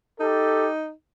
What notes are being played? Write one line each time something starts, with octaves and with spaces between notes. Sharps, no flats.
D#4 G4 A4